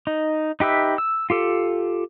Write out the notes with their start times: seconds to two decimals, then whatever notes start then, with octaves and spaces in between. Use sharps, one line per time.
0.07 D#4
0.60 D#4 G4 B4 E5
0.98 E6
1.30 F4 G4 A4